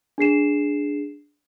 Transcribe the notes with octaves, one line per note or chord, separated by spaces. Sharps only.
D4 G#4 C7 E7